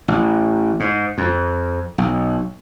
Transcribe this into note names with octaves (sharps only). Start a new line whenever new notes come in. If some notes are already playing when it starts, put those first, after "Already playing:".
A1
G#2
F2
B1